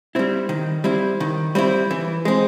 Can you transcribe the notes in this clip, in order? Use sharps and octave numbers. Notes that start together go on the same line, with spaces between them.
G3 C4 E4
D#3
G3 C4 E4
D#3
G3 C4 E4
E3
G#3 C4